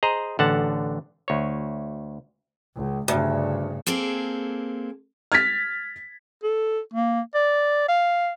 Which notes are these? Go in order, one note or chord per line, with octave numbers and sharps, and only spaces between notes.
G#4 C5 D#5 A#5
A1 D3 F#5 A5
D2 C#5
C#2
D2 G2 C#3
A#3 C4 G#4 A4
F6 G#6 A6 B6
A4
A#3
D5
F5